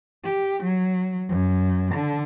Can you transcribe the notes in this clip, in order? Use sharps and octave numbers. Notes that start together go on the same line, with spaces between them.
G4
F#3
F#2
D3